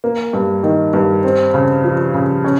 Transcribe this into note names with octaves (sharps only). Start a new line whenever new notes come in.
A#3
G2
D#3
G2
C4
C#3
F3
C#3
C#4